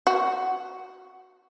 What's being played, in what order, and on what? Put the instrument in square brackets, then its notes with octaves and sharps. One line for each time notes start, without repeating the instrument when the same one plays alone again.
[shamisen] F#4